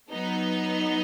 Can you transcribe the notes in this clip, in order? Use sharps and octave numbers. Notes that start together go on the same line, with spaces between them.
F#3 B3 D#4